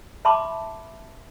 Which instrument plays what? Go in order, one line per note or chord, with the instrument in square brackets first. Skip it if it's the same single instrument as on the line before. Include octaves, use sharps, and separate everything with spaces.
[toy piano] E5 A5 B5 C6 D6